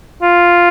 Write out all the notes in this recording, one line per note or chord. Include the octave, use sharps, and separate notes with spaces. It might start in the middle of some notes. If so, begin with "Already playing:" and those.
F4